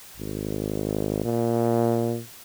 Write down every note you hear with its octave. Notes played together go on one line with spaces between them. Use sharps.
G#1
A#2